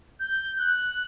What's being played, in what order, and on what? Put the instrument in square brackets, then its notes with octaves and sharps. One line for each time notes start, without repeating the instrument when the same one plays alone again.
[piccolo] G6
F#6